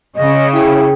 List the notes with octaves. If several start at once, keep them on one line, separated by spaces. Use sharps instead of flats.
C#3 D#5
E4 G#4 G5